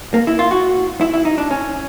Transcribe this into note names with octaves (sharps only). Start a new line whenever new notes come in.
A#3
E4
F4
F#4
E4
E4
D#4
D4
C#4